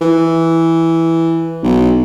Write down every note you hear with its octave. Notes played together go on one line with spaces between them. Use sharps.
E3
B1